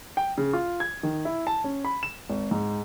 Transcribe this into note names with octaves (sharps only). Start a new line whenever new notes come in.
G5
C#3
F4
G#6
D#3
E4
A5
C#4
B5
E7
G#1
G#2